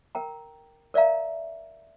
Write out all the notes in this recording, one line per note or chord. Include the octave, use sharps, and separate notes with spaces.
A#4 G5 A#5
A#4 D5 E5 F5 A#5